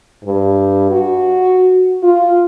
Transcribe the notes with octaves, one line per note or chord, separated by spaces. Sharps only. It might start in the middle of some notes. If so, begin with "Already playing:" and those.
G2
F#4
F4